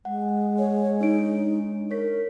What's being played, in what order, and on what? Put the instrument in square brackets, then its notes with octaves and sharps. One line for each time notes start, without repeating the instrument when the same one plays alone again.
[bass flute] G#3 [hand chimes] F#5
[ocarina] C#5
[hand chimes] D4 C#5 D7 [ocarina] D#4
[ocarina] A#4 [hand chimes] C#5 B6